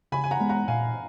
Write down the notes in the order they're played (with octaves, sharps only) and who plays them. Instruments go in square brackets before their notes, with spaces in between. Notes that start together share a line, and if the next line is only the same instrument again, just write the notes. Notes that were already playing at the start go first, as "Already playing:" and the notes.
[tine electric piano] C#3 [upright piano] G#5 B5
[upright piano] G#5
F#5 A#5
[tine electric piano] G#3 B3
[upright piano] F#5 A#5
[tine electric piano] A#2 [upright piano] F5 G#5